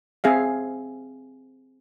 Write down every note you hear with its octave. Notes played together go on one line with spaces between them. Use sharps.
C4 G#4 E5 F5